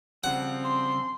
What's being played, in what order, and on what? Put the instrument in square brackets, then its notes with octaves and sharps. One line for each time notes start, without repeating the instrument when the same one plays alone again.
[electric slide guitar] C#3 G3 [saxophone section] F3 C4 [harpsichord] F#5
[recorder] C6